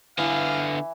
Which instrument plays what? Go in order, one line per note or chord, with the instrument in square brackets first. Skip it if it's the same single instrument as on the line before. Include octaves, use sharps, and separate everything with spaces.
[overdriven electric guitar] D3 B3 [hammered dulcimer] E3 E4 [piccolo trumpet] F5